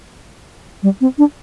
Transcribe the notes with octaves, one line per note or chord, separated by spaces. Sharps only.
G3
C4
D4